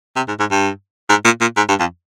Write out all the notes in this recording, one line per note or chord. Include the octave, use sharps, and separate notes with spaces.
C3
G#2
G#2
G2
G#2
A#2
A#2
G#2
G2
F2